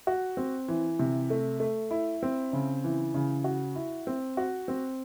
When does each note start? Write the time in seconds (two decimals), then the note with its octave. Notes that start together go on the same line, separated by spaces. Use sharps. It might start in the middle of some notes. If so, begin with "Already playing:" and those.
0.07 F#4
0.37 C4
0.68 E3
0.99 C3
1.30 A3
1.60 A3
1.91 E4
2.23 C4
2.53 C#3
2.84 E3
3.14 C#3
3.44 F#4
3.76 E4
4.07 C4
4.37 F#4
4.68 C4